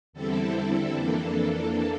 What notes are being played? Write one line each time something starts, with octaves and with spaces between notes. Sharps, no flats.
E2 D3 G3 C4 E4 A4
F2 E3 A#3 D4 A4